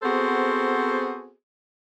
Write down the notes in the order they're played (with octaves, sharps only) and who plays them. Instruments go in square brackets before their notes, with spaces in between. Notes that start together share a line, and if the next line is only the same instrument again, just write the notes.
[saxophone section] B3 C4 F#4 G#4 A4 C5